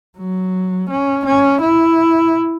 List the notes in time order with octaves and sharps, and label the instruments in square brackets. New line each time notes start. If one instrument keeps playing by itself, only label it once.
[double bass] F#3
C#4
C#4
E4